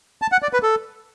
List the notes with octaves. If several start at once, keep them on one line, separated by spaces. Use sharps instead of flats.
A5
F#5
D5
B4
A4